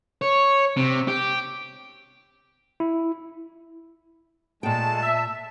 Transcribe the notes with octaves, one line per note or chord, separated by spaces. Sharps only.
C#5
C3
G4
E4
A#2 G#3 A3 G5 A5
E5